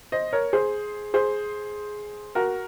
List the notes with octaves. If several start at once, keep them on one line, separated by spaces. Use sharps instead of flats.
C5 D#5
A#4 C#5
G#4 C5
G#4 C5
F#4 A#4